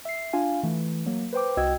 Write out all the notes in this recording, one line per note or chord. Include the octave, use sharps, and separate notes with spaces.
E5 C7
D4 F4 F5 G#5
E3 A3
F#3 A#3
B4 C5 G5 D6
C2 F#4 D#5 G5 E6 G#6